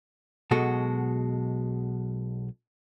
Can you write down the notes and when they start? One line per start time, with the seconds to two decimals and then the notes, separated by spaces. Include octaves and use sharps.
0.51 B1 B2 G#3 F#4 A4